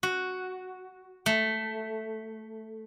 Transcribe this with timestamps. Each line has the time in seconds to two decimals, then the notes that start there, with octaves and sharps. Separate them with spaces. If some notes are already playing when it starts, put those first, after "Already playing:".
0.03 F#4
1.26 A3